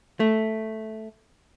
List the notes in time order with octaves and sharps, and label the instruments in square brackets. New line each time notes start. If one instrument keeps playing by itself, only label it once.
[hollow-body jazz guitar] A3